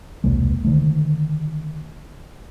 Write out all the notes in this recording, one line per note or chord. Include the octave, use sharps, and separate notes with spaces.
E1 C2 G#3 A#3
D3 D#3 A3